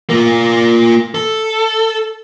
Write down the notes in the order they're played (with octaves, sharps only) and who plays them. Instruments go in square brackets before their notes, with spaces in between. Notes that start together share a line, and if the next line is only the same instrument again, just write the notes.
[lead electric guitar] A#3 F4
A4